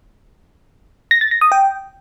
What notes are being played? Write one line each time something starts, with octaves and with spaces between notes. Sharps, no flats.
A#6
A6
A#6
D#6
G5